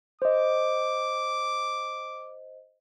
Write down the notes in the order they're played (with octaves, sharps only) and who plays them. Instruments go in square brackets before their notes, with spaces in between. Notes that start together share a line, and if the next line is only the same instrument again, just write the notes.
[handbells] C5 D#5 [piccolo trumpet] D6